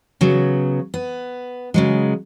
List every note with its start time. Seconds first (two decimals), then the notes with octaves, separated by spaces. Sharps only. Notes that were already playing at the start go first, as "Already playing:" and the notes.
0.21 C#3 F#3 B3
0.94 B3
1.74 C#3 F#3 G#3